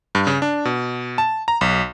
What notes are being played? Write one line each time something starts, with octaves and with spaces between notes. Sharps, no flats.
G2
C#3
D4
B2
A5
A#5
B1